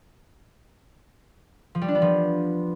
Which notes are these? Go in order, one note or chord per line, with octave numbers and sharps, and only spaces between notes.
F3
G3
D4
B3
F3